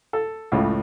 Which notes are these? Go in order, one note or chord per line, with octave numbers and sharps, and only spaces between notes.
A4
C#2 A2 C#3